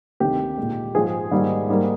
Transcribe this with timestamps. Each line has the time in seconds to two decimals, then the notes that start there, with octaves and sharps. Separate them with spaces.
0.20 D2 C3 D#3 G4
0.58 A#2 G#3
0.95 G#2 F3 G#3 G#4
1.31 G#2 D#3 G3 A#3
1.69 G#2 G3 A#3